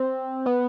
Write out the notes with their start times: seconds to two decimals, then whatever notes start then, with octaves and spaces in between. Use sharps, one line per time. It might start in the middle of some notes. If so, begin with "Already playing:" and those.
Already playing: C4
0.46 B3